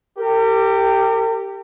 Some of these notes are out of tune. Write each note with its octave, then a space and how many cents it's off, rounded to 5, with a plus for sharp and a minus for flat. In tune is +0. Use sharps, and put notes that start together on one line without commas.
G4 +0 A#4 -40